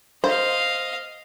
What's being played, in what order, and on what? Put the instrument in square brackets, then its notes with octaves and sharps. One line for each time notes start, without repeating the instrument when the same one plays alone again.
[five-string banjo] C5 [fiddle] D#5 F5